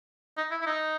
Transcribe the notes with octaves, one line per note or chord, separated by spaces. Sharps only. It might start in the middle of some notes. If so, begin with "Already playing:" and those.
D#4
E4
E4
D#4